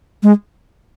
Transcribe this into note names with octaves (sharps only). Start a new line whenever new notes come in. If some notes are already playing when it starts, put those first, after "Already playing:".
G#3